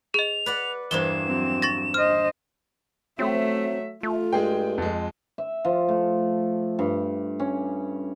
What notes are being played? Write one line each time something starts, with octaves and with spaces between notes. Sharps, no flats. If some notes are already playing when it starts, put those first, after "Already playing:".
G#4 D#5 F7
B4 D5 F#5
E2 G2 A#3 C5 E7 G7
F#3 C4
C#6 A6 A#6
C5 D#5 F6
F#3 A3 C4 E5
A3 F4
G2 G#3 G#4 G5
F2 G#3
E5
F3
A3
G2
C#4